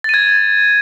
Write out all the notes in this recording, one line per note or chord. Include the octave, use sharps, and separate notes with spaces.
G#6 A6 D#7